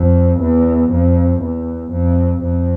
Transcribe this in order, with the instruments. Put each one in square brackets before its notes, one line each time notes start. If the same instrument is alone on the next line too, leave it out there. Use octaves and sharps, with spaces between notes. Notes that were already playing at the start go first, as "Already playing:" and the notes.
Already playing: [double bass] F2
E2
F2
E2
F2
F2